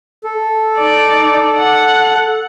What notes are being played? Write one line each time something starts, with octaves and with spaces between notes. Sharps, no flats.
A4
D#4 D5
F#5